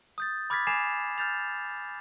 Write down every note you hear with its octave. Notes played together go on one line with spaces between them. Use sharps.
D#6 G6 A6
B5 D6 F6 G#6 A6 B6
G#5 D6 G#6 C7 E7 F7
F6 G6 A6 F7